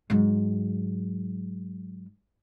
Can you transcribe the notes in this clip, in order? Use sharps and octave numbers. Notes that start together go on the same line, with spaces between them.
G#2 F#3